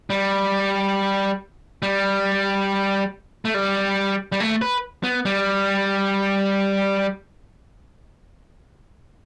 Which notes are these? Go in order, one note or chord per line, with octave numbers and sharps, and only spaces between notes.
G3
G3
A3
G3
G3
A3
B4
B3
G3